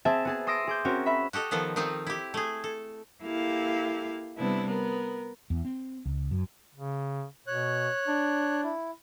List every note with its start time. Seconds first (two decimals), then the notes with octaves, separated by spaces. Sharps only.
0.05 C4 G#4 E5 A5
0.25 B3 G#4 A5
0.47 C6 D#6 E6 A#6 C7 D7
0.67 G#4 D6 G6
0.85 C4 C#4 F#4 A#4
1.06 E5 B5 B6
1.33 F#4 G4 A4 D#5
1.51 D#3 F3 B3 A4
1.76 D#3 F3 C4 D#4 F4
2.07 E4 G4
2.34 A3 G#4
2.64 A4
3.24 A#3 E4 G4 A4 F5
4.38 C3 G3 B3 D4 E4
4.68 B3 A#4
5.50 E2
5.65 C4
6.05 C#2
6.31 F#2
6.75 C#3
7.47 B2 C#5 F#6
8.08 D4
8.64 E4